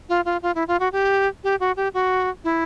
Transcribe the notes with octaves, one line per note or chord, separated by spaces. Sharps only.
F4
F4
F4
E4
F4
F#4
G4
G4
F#4
G4
F#4
E4